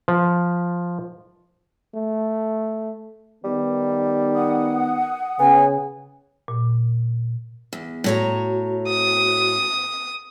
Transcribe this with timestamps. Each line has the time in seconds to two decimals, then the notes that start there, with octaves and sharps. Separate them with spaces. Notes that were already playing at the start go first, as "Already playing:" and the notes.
0.08 F3
1.95 A3
3.44 D#3 G3 B3
4.35 F#5 D#6
5.39 C#3 B3 G#5
6.48 A#2
7.73 E2
8.04 A2 F#4 C#5 A#5
8.88 D#6